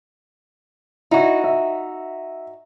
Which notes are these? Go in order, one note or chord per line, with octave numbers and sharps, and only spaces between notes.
D#4 E4 F#4
E5